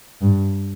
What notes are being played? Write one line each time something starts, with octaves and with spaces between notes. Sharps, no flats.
G2